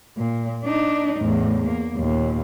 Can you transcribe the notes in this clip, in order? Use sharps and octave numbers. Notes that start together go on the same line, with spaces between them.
A#2
D4 D#4
E2 A2
A#3
D#2 A#2